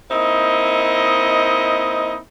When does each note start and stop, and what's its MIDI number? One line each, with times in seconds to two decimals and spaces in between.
0.11 2.18 58
0.11 2.18 60
0.11 2.18 63
0.11 2.18 64
0.11 2.18 75